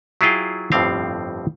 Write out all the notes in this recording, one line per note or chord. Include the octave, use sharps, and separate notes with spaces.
F#3 E4 F4 G#4 F5 G5
G1 F2 A2 G3 C4 F5